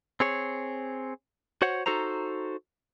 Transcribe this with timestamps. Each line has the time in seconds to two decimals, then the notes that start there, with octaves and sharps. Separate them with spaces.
0.20 C4 G#4 C#5
1.62 F#4 C5 C#5 F#5
1.86 D#4 F#4 A4 C5 A#5